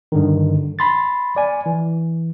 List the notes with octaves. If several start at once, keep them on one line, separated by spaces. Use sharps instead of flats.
G2 D3 D#3
B5 C6 A6
D5 G#5
E3